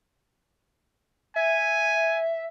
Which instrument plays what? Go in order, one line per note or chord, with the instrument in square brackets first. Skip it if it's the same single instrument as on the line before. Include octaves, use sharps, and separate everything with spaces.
[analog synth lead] E5 [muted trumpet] G#5